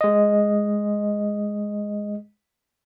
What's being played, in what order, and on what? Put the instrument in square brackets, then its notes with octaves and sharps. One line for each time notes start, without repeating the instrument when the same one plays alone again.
[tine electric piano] G#3 D#5